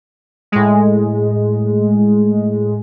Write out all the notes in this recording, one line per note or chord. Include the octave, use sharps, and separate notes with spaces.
A2 G#3